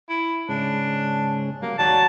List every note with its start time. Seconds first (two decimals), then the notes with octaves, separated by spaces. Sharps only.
0.09 E4
0.49 G#2 C#3 G#3 D4
1.62 F#3 G3 A#3
1.79 D#2 F#3 D5 A5